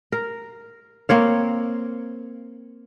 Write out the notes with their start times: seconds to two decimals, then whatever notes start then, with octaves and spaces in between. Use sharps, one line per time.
0.12 A#4
1.09 A#3 C4 C#5 F5